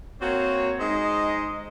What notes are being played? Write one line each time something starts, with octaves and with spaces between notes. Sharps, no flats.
A#3 C4 F#4 C#5
G#3 D#4 C5 D#5